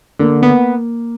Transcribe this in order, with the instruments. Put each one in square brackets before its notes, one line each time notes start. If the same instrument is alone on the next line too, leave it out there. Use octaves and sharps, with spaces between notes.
[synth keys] D3 [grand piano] A#3
[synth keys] B3